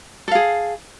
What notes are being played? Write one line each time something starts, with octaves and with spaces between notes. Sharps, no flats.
G#4 A4 F5